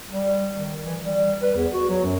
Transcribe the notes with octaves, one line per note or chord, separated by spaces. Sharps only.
G3
D#3
E3
G3
B4
E2
F#4
F#3
F#2